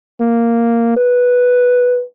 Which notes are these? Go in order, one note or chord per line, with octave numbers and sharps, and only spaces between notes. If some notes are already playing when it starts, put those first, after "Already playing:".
A#3
B4